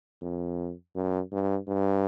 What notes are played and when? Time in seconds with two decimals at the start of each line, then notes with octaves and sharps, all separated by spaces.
0.22 F2
0.95 F#2
1.32 G2
1.69 G2